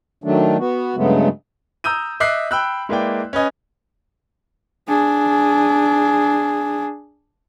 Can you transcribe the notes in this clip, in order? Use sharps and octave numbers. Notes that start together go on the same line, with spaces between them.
D#3 F#3 A3 D4
B3 F#4
G2 C#3 F#3 G#3 A3 B3
A#5 D#6 E6 G6 D#7
D#5 E5 D6 F#6 C7
G5 B5 E6 F#6
G#3 A#3 E4 B4 D5 G5
C#4 B4 D#5 G#5
D4 G#4